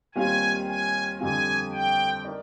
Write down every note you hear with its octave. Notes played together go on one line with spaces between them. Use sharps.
D#2 D#3 G3 C4 F4 G#5
G#5
F2 D3 G3 C4 F4 G#5
G5
D#4 A#4 D5